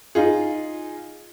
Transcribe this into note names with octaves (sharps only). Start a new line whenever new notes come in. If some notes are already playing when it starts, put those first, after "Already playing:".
D#4 F4 G#4